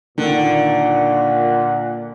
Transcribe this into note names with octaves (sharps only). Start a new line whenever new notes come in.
A#2 D3 D#3 F#5